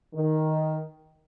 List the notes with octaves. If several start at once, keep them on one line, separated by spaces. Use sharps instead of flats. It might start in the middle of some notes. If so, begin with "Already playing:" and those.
D#3